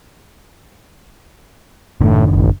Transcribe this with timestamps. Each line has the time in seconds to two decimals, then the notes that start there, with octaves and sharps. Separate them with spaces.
2.01 F#1 A2 D#3 D4
2.35 A1